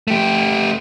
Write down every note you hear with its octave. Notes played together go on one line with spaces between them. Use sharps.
A3 G4